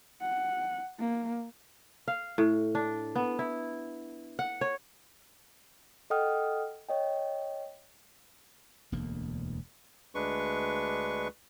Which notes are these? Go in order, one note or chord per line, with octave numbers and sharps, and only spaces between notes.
F#5
A#3
F5
A2
D4
B3
E4
F#5
C#5
A4 D#5 F#5 G5 D#6 F6
C#5 D#5 G5
E1 D2 A#3
D2 G#3 D4 B4 C#6